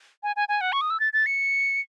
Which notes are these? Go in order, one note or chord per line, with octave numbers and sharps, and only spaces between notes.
G#5
G#5
G#5
F#5
C#6
D#6
E6
A6
A6
C#7